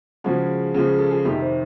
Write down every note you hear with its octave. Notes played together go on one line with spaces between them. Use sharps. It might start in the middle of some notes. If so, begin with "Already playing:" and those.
C#3 F3 G#3 F#4
C#3 F3 G#3
A4
G#4
F2 C3 D#3 G4
C5